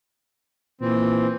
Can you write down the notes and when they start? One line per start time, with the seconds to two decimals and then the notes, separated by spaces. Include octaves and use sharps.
0.81 A#2 E3 C4